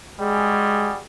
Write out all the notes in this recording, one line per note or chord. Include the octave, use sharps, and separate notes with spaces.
G3 G#3 F#4 G#4